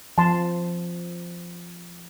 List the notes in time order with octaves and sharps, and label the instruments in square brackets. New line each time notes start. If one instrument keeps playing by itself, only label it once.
[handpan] F3 [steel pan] A5 C6